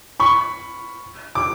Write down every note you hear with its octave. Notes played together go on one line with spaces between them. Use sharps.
B5 C#6
D6